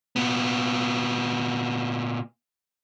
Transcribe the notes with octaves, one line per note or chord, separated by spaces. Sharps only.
A#2 B3